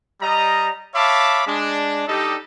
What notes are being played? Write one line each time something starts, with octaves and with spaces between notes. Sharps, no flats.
G3 D#5 A#5
C#5 E5 F5 A5 B5 D6
G#3 D4
G3 D4 D#4 G4 A4 D#5